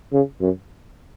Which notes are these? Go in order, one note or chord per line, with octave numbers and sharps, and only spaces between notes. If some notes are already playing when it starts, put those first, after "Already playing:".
C#3
F#2